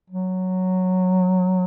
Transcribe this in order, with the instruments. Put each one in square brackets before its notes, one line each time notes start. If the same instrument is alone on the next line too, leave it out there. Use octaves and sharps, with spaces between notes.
[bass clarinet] F#3